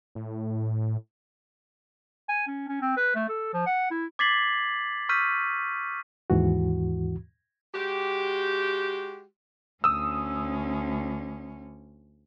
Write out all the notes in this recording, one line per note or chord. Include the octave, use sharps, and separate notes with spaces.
A2
G#5
C#4
C#4
C4
B4
A3
A4
F3
F#5
E4
D6 G#6 A6 B6 C7 F#7
C#6 E6 F6 G6 B6 D#7
D#2 G#2 E3 F#4
G#3 F#4 G4
D2 C#4 D#6 E6